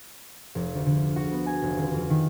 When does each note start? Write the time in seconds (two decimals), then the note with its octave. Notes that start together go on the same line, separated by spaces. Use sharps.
0.55 F1
0.74 D2
0.86 D3
1.16 F#4
1.32 B3
1.46 G#5
1.62 F1
1.76 D#1
1.93 F2
2.10 D#3